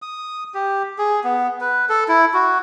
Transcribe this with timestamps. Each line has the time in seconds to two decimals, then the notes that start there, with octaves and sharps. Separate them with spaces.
0.02 D#6
0.54 G4
0.98 G#4
1.24 B3
1.61 B4
1.89 A4
2.08 E4
2.34 F#4